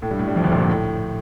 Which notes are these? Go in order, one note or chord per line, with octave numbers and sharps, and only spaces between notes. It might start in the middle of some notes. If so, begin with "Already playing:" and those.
A2 A3
G2 G3
A2 A3
G2 G3
F2 F3
D2 D3
A#1 A#2
G2
A2